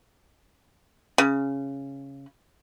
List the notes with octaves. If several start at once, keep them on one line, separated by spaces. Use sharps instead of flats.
C#3